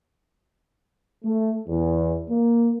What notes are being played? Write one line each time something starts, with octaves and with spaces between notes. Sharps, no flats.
A3
E2
A#3